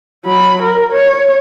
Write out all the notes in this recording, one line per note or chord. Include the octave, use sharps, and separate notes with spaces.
F#3 B5
A#4
C#5